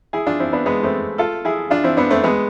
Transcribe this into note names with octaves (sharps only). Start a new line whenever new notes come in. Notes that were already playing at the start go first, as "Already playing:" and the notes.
E4 G#4
D4 F4
C4 E4
B3 D4
G#3 B3
A3 C4
F4 A4
E4 G#4
D4 F4
C4 E4
B3 D4
A3 C4
G#3 B3